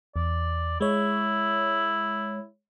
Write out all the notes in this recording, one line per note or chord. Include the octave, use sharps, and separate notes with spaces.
E2 D5
G#3 E4 C#5